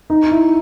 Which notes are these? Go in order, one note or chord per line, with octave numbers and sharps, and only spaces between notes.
D#4
E4